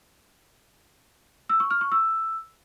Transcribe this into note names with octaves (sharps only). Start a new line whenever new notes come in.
E6
C#6
F6
C#6
E6